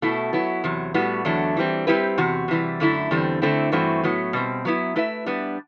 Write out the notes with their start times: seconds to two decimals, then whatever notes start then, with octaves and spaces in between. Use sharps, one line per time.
0.02 B2 A3 E4
0.33 F#3 B3 E4
0.64 E2 C3 F#3
0.94 A2 G3 B3 F#4
1.25 E2 D3 F#3 A3 D4
1.57 E3 G3 C4
1.87 G3 C4 E4 G4 B4
2.18 E2 C3 F#4
2.48 C3 E3 G3
2.80 F#2 D3 A3 E4
3.11 E2 D3 G3 C4
3.42 D3 A3 C4 E4
3.72 G2 E3 A3 C4 F#4
4.04 A2 F#3 B3
4.33 B2 G3 C4
4.65 F#3 B3 E4
4.96 A3 E4 B4 E5
5.26 G3 B3 D4